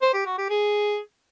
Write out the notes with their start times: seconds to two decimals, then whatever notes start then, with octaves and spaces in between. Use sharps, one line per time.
0.02 C5
0.14 G4
0.26 F#4
0.38 G4
0.50 G#4